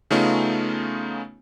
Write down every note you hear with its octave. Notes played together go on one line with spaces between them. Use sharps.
C#3 A3 B3 C#4 D#4 F4